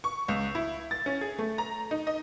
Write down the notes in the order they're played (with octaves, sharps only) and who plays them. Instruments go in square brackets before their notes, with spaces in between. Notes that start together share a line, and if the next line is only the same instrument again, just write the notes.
[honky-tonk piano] C#6
C#2
E4
A6
C#4
G#4
A3
A#5
D#4
D#5